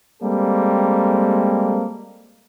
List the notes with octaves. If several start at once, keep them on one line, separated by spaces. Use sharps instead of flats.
G3 G#3 A#3 C4 A4